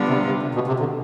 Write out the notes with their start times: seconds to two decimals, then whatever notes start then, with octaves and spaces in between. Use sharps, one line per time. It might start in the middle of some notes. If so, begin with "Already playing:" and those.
Already playing: D3 G3 B3 D4 F4
0.08 C3
0.25 C3
0.42 C3
0.55 B2
0.67 C3
0.79 D3